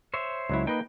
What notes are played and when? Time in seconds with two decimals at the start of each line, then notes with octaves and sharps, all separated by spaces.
0.14 C5 C#5 E5
0.49 C#2 F#3 E4
0.67 A#3 D#4 B4 D#5 G5